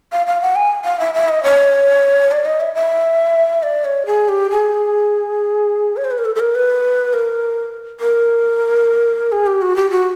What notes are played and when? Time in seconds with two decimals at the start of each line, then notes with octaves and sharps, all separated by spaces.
0.12 F5
0.27 F5
0.41 F#5
0.56 G#5
0.85 F5
1.00 E5
1.14 E5
1.29 D#5
1.43 C#5
2.31 D5
2.45 D#5
2.60 E5
2.75 E5
3.63 D5
3.85 C#5
4.06 G#4
4.29 G4
4.50 G#4
5.97 C#5
6.05 C5
6.11 B4
6.18 A#4
6.25 A4
6.35 A4
6.40 A#4
6.55 B4
7.13 A#4
8.00 A#4
9.32 G#4
9.47 G4
9.62 F#4
9.76 G4
9.90 F#4